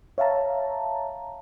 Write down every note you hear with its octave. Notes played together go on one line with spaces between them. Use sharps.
C#5 E5 F5 A5 A#5